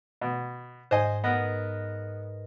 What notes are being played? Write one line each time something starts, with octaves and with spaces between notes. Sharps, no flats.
B2
G#2 C5 D#5 G#5
B3 A#4 B4 D#5